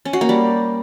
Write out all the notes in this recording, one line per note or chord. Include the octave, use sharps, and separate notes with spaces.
C#4
F#4
A#3
G3